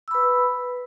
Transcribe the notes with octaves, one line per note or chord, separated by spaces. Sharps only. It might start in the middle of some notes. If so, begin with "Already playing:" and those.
B4 B5 E6